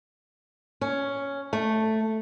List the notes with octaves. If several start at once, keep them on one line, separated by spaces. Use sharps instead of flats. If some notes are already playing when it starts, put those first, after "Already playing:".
C#4
A3